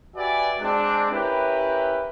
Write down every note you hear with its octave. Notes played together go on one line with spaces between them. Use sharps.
F#4 G4 B4 D5 E5 G#5
G#3 C4 D4
C#4 E4 G4 A#4 B4